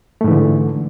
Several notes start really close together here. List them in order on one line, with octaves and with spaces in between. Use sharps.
A3 G#2 E3 D3